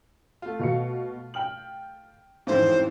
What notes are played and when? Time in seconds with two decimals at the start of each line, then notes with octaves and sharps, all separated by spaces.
0.42 A3 F4
0.59 B2 F5 C#7
1.34 G5 F6 F#7
2.47 A1 F2 G#2 D#3 E3 C5